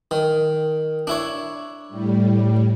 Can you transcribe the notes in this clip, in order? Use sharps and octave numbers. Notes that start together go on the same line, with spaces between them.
D#3
D4 E4 C#5
A2 G3